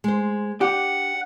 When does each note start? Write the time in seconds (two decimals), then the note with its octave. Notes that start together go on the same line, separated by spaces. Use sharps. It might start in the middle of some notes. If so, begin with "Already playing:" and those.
0.04 G#3 C5
0.61 D4 G4 F#5